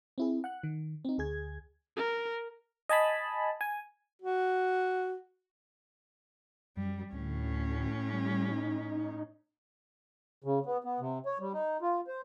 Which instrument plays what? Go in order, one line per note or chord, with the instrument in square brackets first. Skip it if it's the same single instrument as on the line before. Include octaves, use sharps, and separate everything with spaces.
[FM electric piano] C4 E4 G#4
F#5 F#6
D#3
C4 D#4
D2 G#4 G#6
[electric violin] A#4
[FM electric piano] D#5 G#5 A5 B5
G#5
[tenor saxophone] F#4
[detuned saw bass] F#2 [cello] G3
[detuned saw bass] D2 [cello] A2 C#4
[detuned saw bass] G3
D#4
[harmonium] C#3
B3
B3
C3
C#5
G3
D#4
F4
C5